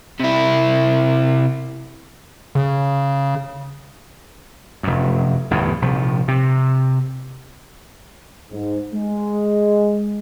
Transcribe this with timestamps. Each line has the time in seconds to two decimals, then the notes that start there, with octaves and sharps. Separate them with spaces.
0.20 C3 E4
2.55 C#3
4.83 F1 F#2
5.51 G1 E2 A2 E3
5.82 A#1 C3 F3
6.28 C3
8.51 G#2
8.93 G#3